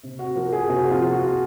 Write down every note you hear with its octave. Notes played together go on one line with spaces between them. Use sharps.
C3
F#4
F3 A#4
G#4
C3 F#4
F4
F3
F#4